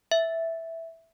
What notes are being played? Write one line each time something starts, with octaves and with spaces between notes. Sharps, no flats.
E5